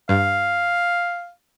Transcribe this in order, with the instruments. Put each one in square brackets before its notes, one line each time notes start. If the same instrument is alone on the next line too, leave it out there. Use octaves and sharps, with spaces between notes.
[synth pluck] G2 [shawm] F5